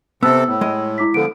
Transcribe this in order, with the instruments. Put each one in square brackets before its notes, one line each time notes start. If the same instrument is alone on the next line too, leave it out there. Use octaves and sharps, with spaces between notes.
[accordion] C3 C4 A4 [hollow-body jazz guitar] B3 [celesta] E6
[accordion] A2
[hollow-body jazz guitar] G#3 D#5
[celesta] E4 D6 B6
[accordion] D3 F3 B3 [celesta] A4 D7